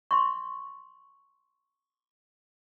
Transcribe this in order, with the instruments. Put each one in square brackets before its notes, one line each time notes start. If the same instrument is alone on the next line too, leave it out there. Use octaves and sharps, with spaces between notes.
[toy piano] C6 C#6